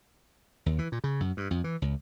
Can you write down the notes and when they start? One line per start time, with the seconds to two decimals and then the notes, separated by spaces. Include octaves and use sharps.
0.66 D#2
0.79 E3
0.92 A#2
1.04 C#3
1.20 F#2
1.37 G2
1.51 F2
1.64 E3
1.82 C#2